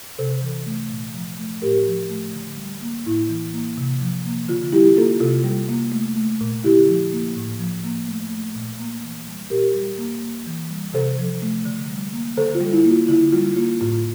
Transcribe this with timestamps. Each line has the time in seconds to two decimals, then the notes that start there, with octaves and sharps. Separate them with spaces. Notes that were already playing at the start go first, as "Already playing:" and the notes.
0.19 C3 A4 C5
0.42 E3
0.66 A3
0.90 A#2
1.14 F3
1.39 A3
1.62 A2 G4 A#4
1.86 F3
2.10 A3
2.34 D3
2.57 G3
2.82 A#3
3.06 A2 E4
3.29 E3
3.54 A#3
3.78 C3
4.01 F3
4.26 A#3
4.49 D3 F4
4.72 G3 E4 G4
4.97 A#3 F4 A4
5.20 C3 F4 A4
5.44 G3
5.69 A#3
5.92 A3
6.16 A3
6.41 A#2
6.64 D3 E4 G4
6.87 F3
7.12 A#3
7.36 A2
7.59 F3
7.84 A#3
8.08 A3
8.31 A3
8.55 A#2
8.79 A#3
9.03 E3
9.27 G3
9.50 A#2 G4 A#4
9.75 G3
9.98 A#3
10.22 A#3
10.47 E3
10.70 G3
10.93 C3 A4 C5
11.19 F3
11.42 A3
11.65 D3
11.90 G3
12.13 A#3
12.37 D3 A4 C5
12.55 F4
12.61 G3
12.73 E4
12.85 A#3
12.91 F4
13.08 D3 E4
13.32 G3 F4
13.56 A#3 F4
13.81 A2 F4